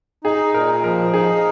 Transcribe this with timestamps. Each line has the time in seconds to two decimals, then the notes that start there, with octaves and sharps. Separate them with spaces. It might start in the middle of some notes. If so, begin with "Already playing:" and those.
0.24 D#4 G#4
0.54 A#2 A#4
0.84 F3 A#4
1.14 D#4 G#4